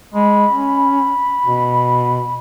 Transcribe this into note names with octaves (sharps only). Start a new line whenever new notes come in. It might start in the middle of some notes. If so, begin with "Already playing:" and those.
G#3 B5
C#4
B2